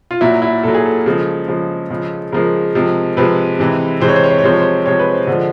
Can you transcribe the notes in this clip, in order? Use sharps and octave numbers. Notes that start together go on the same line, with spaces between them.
F4
A#2 F#3 E4
E4
A#2 F#3 A4
G#4
A4
C#3 F3 G#3
C#3 F3 G#3
C#3 F3 G#3
C#3 F3 G#3 A#4
C3 F3 G#3
C3 F3 G#3 B4
C3 E3 G#3
C3 E3 G#3 C5
C#5
C5
C#5
C5
C#5
C3 F3 G#3 C5
C#5
C5
C3 F3 G#3 C#5
B4
C5
D3 F3 G#3